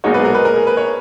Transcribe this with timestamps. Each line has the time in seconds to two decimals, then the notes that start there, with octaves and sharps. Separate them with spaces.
0.04 B1 A#2 G#3 D#4 F#4 C#5
0.14 B4
0.19 G#4
0.25 A#4
0.35 B4
0.45 A#4
0.56 G#4
0.67 B4
0.77 C#5